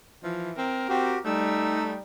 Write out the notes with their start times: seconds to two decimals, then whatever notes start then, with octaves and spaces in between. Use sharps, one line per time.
0.24 E3 F3
0.57 C4 A#4
0.89 C4 F#4 G4
1.25 G3 A3 D#4 E6